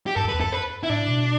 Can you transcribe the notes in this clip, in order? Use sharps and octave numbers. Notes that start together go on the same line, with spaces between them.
G4
G2 A4
F#2
B4
E2
F#2 A4
B4
E4
A2 D4
B2